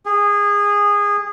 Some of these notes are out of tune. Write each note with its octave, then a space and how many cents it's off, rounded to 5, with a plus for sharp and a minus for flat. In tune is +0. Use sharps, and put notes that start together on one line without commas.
G#4 -20